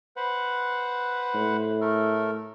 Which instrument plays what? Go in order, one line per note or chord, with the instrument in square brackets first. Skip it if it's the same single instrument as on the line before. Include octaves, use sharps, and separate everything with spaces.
[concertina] B4 C5 F#5
[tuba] A2
[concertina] A3 A4 A#4